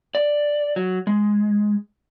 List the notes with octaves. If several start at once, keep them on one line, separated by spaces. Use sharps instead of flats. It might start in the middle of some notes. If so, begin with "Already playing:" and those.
D5
F#3
G#3